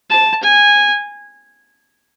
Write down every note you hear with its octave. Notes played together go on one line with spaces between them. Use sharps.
A5
G#5